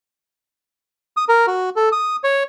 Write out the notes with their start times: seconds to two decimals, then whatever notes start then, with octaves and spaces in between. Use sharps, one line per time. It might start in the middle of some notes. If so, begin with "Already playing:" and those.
1.17 D#6
1.29 A#4
1.47 F#4
1.76 A4
1.92 D#6
2.24 C#5